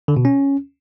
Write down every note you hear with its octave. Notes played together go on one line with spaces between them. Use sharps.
D3
B2
C#4